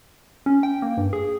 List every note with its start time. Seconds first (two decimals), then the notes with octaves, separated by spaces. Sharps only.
0.46 C#4
0.63 G5
0.82 A#3
0.97 G2
1.13 G#4